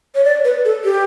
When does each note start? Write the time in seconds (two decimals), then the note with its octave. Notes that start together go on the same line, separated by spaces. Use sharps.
0.15 C#5
0.24 D5
0.44 B4
0.65 A4
0.84 G4